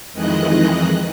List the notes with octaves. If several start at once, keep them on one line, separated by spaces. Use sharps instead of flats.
F2 D#3 E3 G#3 D#5 F#6